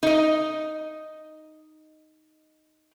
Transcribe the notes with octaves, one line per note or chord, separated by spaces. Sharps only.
D#4 D#5